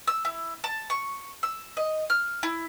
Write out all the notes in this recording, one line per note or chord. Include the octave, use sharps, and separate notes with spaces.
E6
E4
A5
C#6
E6
D#5
F6
E4